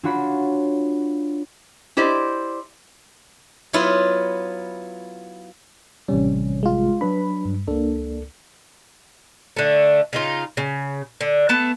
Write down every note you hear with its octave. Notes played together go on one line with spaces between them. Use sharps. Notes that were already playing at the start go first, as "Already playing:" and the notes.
D4 F4 F#4 C#5 B5
E4 G4 C5 D5 D#5
F#3 B3 E4 F4
A1 C3 G3 C#4
G#3 F4
F#3 D4 B4 B5
G2
C#2 A#3 D4 A4
D3 A3
C#3 D#4 F4
C#3
D3
A3 B3 A5